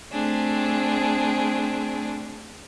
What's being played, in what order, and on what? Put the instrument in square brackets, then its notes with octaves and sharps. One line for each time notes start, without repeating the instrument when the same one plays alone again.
[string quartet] A3 C4 D4 G#4